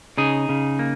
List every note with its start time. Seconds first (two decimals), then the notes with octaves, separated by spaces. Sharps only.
0.18 C#3 D#4 G#4
0.49 C#3
0.79 A#3